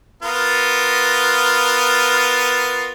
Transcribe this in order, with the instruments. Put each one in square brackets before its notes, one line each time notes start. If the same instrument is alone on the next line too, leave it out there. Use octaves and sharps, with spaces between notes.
[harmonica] B3 F4 A#4